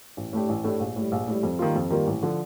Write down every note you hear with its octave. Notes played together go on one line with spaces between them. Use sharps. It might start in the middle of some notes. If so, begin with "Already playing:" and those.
A1
A2 A3 D4 G4
A1
A2 A3 D4 G4
A#1
A2 G3
A#1
A2 G3
F2
D#3 G3 A#3 F4
F2
D#3 G3 A#3 F4
A1
D3 F3